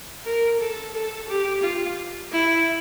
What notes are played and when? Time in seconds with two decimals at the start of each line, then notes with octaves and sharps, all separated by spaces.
0.24 A#4
0.59 A4
0.94 A4
1.28 G4
1.63 F4
2.32 E4